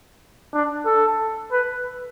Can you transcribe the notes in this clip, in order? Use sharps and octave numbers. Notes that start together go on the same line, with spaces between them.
D4
A4
B4